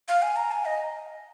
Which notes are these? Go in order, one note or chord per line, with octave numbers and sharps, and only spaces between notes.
F5
G#5
A#5
G#5
D#5